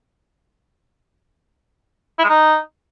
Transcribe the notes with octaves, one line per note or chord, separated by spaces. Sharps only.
E4
G#3
D#4